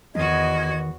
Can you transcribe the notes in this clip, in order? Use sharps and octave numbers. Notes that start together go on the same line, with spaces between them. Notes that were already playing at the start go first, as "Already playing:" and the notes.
E2 D#3 F#4 D#5 G#6